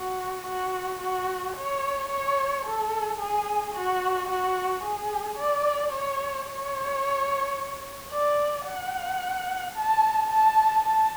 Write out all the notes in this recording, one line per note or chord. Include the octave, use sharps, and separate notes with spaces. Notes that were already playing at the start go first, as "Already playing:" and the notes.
Already playing: F#4
F#4
F#4
C#5
C#5
A4
G#4
F#4
F#4
G#4
D5
C#5
C#5
D5
F#5
A5
A5
A5